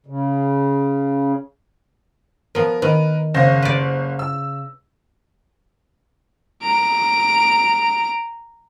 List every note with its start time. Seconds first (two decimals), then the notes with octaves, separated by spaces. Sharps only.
0.06 C#3
2.55 F3 B3 A#4
2.82 D#3 A#4 B4
3.34 F#1 C#3 C5 A#6
3.62 B4 D5
4.19 E6
6.63 A#5 D7